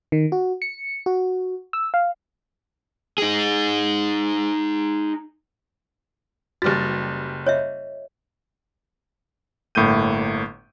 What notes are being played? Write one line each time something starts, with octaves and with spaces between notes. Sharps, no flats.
D#3
F#4
C#7
F#4
E6
F5
D#4 G#4
F#1 G3 F#4 B4 A6
C#5 D#5 E5
G1 A2 A#3 G6 D#7